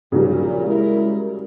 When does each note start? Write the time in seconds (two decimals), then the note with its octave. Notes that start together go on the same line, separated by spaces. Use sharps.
0.12 A#1 A#2 C#3 F#3 G3
0.65 G#3 E4 A#4